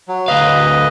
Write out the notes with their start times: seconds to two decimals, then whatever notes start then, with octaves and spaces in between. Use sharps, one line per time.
0.08 F#3
0.28 D2 B4 D#5 F5